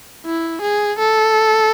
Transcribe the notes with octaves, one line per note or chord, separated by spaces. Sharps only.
E4
G#4
A4